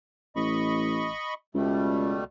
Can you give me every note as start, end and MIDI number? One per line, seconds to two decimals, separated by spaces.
0.36 1.12 33
0.36 1.34 75
0.36 1.34 83
0.36 1.34 85
1.55 2.20 37
1.55 2.24 47
1.55 2.24 55
1.55 2.24 57